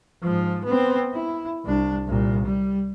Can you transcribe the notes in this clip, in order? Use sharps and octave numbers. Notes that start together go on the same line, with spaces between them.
G#2 F3
B3 C4
E4
C2 D4
C2 A#2
G3